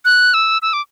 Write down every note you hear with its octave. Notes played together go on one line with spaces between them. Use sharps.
F#6
E6
E6
D6